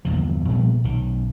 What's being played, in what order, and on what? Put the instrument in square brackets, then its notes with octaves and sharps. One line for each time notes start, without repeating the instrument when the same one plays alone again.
[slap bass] G1 E2 A#2 F3
A#2 F3 G3 B3
B1 D#3